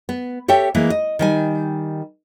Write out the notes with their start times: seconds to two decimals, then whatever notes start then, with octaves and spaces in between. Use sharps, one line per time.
0.09 B3
0.48 G4 A4 C#5 E5 G5
0.75 E3 G#3 A#3
0.90 D#5
1.19 D#3 G3 G#5